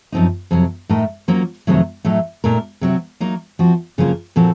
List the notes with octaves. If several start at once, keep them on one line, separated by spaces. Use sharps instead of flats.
F#2 F3 C4 D#4
F2 C3 F#3
A2 A3 D#4 A#4
F#3 A#3 C#4 F4 C5
F2 C3 D#3 F#3 A3
A2 F#3 A3 D#4
A#2 A3 D#4 A#4
C3 F#3 C4 F#4
F#3 A#3 D#4 A#4
F3 C4 F#4
F2 C#3 F#3 A#3 F4
A#2 F3 C4 F#4 A4